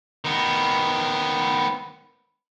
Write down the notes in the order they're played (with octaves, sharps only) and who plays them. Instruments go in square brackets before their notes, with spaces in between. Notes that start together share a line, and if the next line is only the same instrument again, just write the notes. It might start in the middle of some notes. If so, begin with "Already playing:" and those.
[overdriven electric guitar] D#3 B3